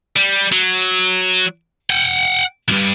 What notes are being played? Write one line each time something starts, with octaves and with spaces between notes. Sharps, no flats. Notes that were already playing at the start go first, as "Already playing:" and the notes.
G3
F#3
F#5 G5
B1 G2